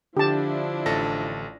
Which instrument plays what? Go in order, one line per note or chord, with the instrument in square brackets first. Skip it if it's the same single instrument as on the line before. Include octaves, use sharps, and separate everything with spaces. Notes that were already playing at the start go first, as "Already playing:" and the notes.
[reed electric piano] D3 [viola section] F3 D4 E4 [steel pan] G4 A5
[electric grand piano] A1 A4 A#6